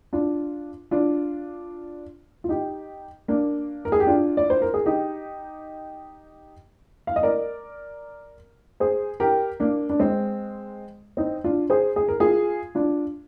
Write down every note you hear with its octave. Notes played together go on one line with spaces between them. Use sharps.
D4 F4
D4 F4
F4
D#4 G4
A#3 D4
A#4
G#4
G4
D4 F4
D5
C5
A#4
G#4
D#4 G4
F5
D#5
A#4 D5
G#4 C5
G4 A#4
A#3 D4
D4
G#3 C4
C4 D#4
D4 F4
G#4 C5
G#4
A#4
F4 G#4
D4 F4